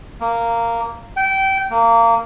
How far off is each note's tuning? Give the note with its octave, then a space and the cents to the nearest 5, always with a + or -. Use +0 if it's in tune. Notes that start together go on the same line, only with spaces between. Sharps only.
A#3 -10
G5 -25
A#3 -20